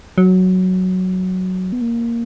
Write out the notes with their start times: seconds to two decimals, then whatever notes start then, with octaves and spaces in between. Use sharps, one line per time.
0.18 F#3
1.72 B3
1.81 A#3